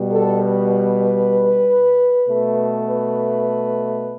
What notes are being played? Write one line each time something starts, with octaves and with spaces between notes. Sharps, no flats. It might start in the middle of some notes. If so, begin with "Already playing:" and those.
Already playing: B2 G3
A4
B4
B2 A3
B4